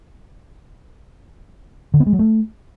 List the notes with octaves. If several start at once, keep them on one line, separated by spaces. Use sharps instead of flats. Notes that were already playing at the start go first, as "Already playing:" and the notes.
D3
B3
G#3
F#3
A3